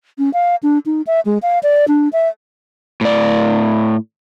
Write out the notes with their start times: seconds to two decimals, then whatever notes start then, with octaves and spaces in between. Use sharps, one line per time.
0.19 C#4
0.33 F5
0.63 D4
0.86 D#4
1.07 E5
1.25 G#3
1.42 F5
1.63 D5
1.88 D4
2.13 E5
3.01 A2 D5